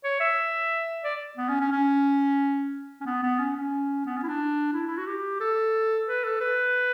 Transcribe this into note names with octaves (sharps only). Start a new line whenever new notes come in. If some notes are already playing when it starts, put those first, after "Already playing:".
C#5
E5
D5
B3
C#4
C#4
C#4
C#4
B3
B3
C#4
C#4
B3
C#4
E4
D4
E4
E4
F#4
G4
A4
B4
A4
B4